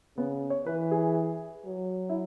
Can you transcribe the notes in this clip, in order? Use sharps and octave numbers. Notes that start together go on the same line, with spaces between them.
C#3 B3
C#5
E3 B4
G#4
F#3
E4